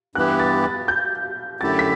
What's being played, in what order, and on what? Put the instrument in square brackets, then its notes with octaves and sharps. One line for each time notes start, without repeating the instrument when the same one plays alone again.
[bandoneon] G2 E3 B3 E4 G4 [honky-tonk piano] F#6
[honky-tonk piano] A6
A6
G6
[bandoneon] F#2 D3 A3 E4 G4 [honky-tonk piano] A6
[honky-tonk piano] B6